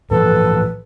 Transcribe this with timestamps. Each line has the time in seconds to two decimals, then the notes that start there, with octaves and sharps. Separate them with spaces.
0.11 A2 E3 F3 A4 B4